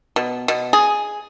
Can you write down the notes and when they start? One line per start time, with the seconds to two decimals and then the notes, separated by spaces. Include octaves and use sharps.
0.16 B2
0.48 B2
0.73 G#4